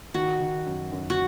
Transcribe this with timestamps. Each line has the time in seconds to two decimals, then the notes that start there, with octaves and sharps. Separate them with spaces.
0.14 D#3 F#4
0.39 D#3
0.66 F#2
0.92 F#2
1.10 F#4